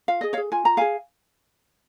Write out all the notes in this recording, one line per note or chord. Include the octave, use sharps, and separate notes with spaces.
F4 F5
G#4 D#5
C#5 F5
G#4
F4 G#5
F4 A#5
G#4 F5 G#5